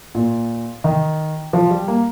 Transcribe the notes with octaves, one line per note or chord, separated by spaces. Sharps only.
A#2
D#3
F3
G3
A#3